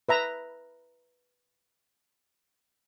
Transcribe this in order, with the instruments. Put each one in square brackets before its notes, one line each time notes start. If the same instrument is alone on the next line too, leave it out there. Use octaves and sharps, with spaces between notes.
[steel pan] B4 E5 A#5